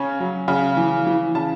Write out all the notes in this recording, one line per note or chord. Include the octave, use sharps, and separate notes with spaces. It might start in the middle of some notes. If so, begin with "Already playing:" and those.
Already playing: C#3 C#4 G#5
F#3
C#3
E3
E3
C#3 A5